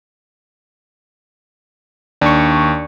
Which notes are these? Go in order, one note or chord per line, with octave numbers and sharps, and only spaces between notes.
D#2 D4 C#6